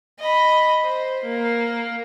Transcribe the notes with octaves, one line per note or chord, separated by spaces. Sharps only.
D#5 B5
C5
A#3